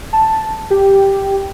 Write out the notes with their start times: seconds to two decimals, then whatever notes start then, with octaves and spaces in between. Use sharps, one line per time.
0.13 A5
0.70 G4